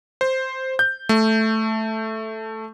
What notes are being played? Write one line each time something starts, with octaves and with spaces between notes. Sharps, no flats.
C5
G6
A3